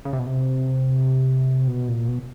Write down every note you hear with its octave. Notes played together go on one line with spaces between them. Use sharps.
C#3
C3
B2
C3
B2
A#2
B2